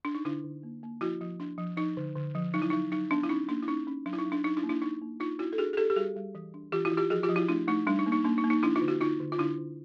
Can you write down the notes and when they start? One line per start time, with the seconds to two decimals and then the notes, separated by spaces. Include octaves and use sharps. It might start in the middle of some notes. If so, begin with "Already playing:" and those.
0.05 D4
0.15 D#4
0.25 D3 D4 E4
0.44 D3
0.63 A#3
0.83 A#3
1.01 F3 E4 F#4
1.21 F3
1.40 D4
1.58 F3
1.77 F3 D#4
1.97 D3
2.16 D3
2.35 F3
2.54 F#3 D#4
2.62 E4
2.70 D#4
2.73 F#3
2.92 F#3 D#4
3.11 B3 D4
3.23 E4
3.29 C#4 D#4
3.48 A#3 D4
3.62 E4
3.68 C#4 D#4
3.87 C#4
4.06 F#3 D4
4.13 E4
4.19 D#4
4.25 F#3
4.32 D4
4.44 F#3 D#4
4.57 D4 E4
4.63 A#3
4.69 D4 E4
4.82 D4 D#4
5.01 A#3
5.20 D4 D#4 F4
5.39 D4 E4 F#4
5.53 A4
5.58 D4 F#4 G#4
5.73 G#4
5.77 D4 G4 A4
5.90 G4
5.96 G3 F#4 G#4
6.16 G3
6.35 E3
6.54 D4
6.72 E3 F4 G4
6.85 E4 F#4
6.92 E3
6.97 F4 G4
7.10 F3 F#4 G#4
7.23 F4 G4
7.29 F3
7.36 E4 F#4
7.48 A3 D4 E4
7.67 A3 D#4
7.87 G3 D4
7.99 D#4
8.06 A#3
8.12 D#4
8.24 A#3 D4
8.38 D#4
8.44 A#3
8.50 D#4
8.63 F3 D4 E4
8.76 D#4 F4
8.81 D3
8.88 E4 F#4
9.01 D3 D#4 F4
9.20 D3
9.32 F4
9.39 D3 D4 E4
9.58 D3